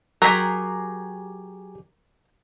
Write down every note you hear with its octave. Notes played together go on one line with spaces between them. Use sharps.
F#3 G4 G#4 A#4 C6